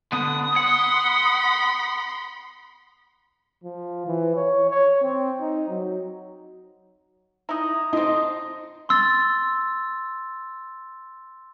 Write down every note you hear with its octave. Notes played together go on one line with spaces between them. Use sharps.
D3 B3 D#6
F#5 B5 C6
F3
E3
C#5
C#5
C4
D#4
F#3
D#4 E4 A#5 D#6
D3 C4 D#4 D#5
C6 E6 A6